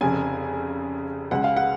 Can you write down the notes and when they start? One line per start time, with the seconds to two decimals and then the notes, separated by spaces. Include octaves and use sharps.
0.01 F1 F2 C#3 G#5
1.31 C#2 C#3 G#3 F#5
1.44 F5
1.57 F#5